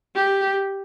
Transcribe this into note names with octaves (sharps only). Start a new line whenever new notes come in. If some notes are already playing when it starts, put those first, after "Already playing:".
G4